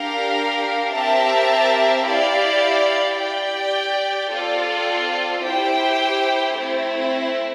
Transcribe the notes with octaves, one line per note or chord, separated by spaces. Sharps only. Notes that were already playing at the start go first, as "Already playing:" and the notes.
Already playing: D4 G4 A#4 F5
C4 G4 A#4 E5 A5
E4 G4 D5 F5
G4 D5 G5
C4 F4 A4 D5
E4 G4 C5 G5
A3 C4 E4